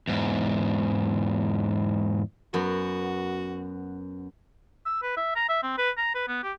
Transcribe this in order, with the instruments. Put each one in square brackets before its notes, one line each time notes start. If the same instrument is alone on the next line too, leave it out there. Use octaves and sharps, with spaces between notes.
[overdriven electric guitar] E2 G#2
[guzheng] F#2 B3 [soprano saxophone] F#4
[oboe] E6
B4
E5
A#5
E5
C4
B4
A#5
B4
B3
G4